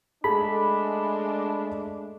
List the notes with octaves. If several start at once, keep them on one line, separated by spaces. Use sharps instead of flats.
G#3 A3 D4 G#4 A4 A5 B5